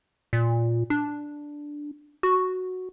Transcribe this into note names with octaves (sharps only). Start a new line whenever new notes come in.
A#2
D4
F#4